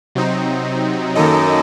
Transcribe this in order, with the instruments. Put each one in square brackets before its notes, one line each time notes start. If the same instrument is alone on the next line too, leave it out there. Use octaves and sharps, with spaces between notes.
[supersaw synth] C3 F#3 C4 D#4
[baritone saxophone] F#2 [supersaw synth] D#3 A#3 D#4 A4 D#5